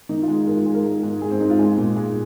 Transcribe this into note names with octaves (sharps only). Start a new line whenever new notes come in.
D#3 D#4
F4
G#3
G#2 A#4
F4
G#2 G#4
A#4
G#2
G#2
G#2 G#4
C4
G#2 D#4
F4
G#3 G#4
A#2
G#3